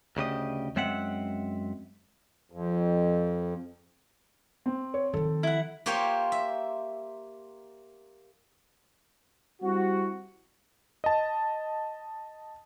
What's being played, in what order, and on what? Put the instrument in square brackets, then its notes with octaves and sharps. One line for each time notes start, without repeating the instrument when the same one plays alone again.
[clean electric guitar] D2 C#3 G4 D#5
F#2 G#3 C4 E5 F#5
[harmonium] F2
[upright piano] C4
[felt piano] C#5
[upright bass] D#3 F3 [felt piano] A4
[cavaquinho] E4 F#5
[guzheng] A#3 F4 G4 C5 C#5
E5
[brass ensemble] G3 C4 E4 F#4
[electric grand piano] D#5 A5